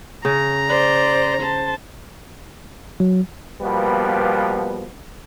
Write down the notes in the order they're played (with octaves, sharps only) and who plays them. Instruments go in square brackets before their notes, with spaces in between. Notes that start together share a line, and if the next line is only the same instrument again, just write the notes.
[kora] C#3 [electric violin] A#5
[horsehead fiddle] C5 [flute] D5
[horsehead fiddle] C5 A5
[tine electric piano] F#3
[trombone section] B2 F3 G3 A#3 B3 B4